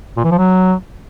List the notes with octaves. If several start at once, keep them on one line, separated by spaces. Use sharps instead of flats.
A#2
E3
F3
F#3